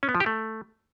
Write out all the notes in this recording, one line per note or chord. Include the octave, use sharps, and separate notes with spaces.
C#4
B3
F3
G4
A3